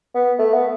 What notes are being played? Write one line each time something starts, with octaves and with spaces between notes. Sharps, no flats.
B3
A3
B3